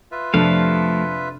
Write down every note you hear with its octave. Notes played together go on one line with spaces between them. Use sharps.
F4 B4 E5
F2 C3 F3 A3 D4 A4 F5